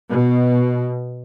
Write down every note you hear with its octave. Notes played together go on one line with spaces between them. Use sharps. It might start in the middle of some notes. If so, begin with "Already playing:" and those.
B2